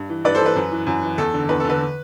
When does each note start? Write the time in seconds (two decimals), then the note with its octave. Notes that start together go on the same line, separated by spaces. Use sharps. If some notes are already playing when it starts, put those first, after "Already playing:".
Already playing: G2
0.10 E3
0.25 G2 B4 D5
0.35 A4 C5
0.40 E3
0.46 B4
0.56 F#2
0.71 E3
0.87 F#2
1.03 E3
1.18 E2 A4
1.34 D3
1.49 E2 B4
1.60 D3 A4
1.70 B4